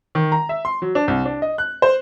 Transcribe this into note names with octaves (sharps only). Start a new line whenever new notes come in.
D#3
A#5
E5
C6
F#3
D4
C2
D4
D#5
F#6
C5